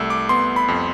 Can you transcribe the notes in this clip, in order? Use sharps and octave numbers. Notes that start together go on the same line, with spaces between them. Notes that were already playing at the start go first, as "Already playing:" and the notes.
Already playing: C2 A3 E6
D6
B3 C6
B5
F2